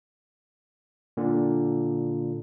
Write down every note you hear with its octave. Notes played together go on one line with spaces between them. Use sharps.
A#2 D3